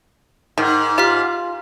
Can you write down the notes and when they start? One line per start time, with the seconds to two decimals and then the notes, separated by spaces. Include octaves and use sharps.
0.58 G#2 D#3
0.98 F4 G4 F6 B6